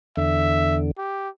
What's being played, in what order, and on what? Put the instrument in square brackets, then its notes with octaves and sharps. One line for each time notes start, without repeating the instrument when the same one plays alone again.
[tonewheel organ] E2 D3 [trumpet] E5
[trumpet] G4